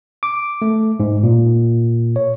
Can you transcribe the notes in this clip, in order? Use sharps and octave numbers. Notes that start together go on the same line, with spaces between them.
D6
A3
G#2
A#2
C#5